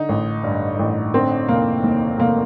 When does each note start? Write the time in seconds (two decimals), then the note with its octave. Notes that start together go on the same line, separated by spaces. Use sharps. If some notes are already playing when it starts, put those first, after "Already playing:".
Already playing: D3 D#4
0.09 A1
0.44 G2
0.79 A1
1.13 D3 C4
1.48 F1 A#3
1.83 D#2
2.19 F1 A#3